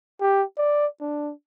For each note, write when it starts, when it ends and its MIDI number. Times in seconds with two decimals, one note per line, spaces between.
0.21 0.44 67
0.58 0.87 74
1.01 1.32 62